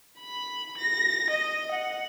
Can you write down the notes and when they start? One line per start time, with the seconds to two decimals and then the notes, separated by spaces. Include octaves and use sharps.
0.20 B5
0.78 A#6
1.30 D#5
1.72 F#5